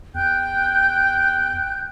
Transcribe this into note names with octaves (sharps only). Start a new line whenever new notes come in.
E2 G5 F#6 G6